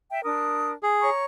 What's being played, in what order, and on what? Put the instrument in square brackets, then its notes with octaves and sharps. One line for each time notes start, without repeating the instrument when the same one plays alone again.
[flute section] E5 G5
D4 A#4 D#6
[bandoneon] G#4
[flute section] C#5 A#5 C#6